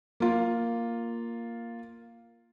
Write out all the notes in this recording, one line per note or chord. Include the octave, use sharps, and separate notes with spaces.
A#3 F4